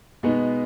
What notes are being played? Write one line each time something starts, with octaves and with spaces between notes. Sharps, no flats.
B2 G#3 B3 D#4